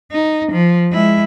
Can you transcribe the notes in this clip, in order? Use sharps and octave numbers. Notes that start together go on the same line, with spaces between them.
D#4
F3
G#3 E4